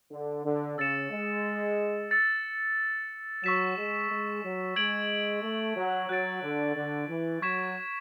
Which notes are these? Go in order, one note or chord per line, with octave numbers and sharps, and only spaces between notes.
D3
D3
C#3 E6 A6 C#7 E7
G#3
E6 A6 C#7
F#3 C#6 E6 B6 E7
G#3
G#3
F#3
G#3 G#6 D7 F#7
A3
F#3
F#3 F#6 A6 D7
D3
D3
E3
F#3 C#6 G#6 B6 E7